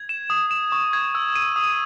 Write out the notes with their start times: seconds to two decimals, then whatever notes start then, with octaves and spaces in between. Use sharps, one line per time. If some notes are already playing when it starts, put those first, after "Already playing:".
Already playing: G#6
0.09 E7
0.30 D#6
0.51 E7
0.72 C#6
0.93 G#6
1.15 E6
1.35 D#7
1.56 D#6